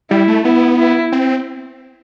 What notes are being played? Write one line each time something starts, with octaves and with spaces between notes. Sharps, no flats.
G3 E4
A3
B3 E4
E4
C4